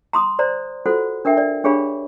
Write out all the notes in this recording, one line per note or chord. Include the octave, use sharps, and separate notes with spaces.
A#5 C6 D#6
C5 D5 A#5
F4 F#4 A4 C5 F#5
D4 A#4 E5 G5
D5
D4 G4 G#4 C#5 F5 B5